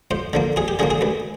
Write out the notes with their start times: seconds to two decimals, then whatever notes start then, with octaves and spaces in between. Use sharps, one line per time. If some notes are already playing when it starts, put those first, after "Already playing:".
0.11 F2 C5
0.33 D3 F3 A#3
0.56 F2 G#4
0.68 G4
0.79 D3 F3 A#3 G#4
0.90 G#4
1.01 D2 B4